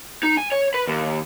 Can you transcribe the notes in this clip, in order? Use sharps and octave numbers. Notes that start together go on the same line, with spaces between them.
D#4
G#5
C#5
B4
D#2